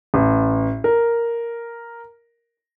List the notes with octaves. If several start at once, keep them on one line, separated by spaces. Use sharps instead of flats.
A1
A#4